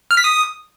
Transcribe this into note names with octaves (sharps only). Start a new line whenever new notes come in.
F6
B6
D#6